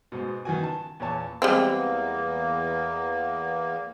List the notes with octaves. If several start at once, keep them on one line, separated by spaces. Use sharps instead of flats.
G#2 B2
D#3 E3 F#4 G#5
A5
E2 A#2 C#5 A5
E2 G3 G#3 A#3 C4